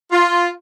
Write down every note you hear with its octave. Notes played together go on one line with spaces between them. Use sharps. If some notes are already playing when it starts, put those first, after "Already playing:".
F4